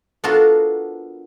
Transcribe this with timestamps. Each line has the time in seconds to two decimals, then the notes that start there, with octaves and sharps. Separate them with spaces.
0.24 B3 D4 F4 F#4 A4 A#4